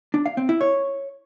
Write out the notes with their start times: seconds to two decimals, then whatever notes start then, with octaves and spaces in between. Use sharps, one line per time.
0.14 D4
0.26 F5
0.37 C4
0.49 E4
0.61 C#5